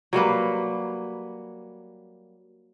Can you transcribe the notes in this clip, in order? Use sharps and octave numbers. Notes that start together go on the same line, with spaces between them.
F#3 G3 A#3 B4